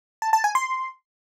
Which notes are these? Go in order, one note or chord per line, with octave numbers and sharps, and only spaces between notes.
A5
A5
G#5
C6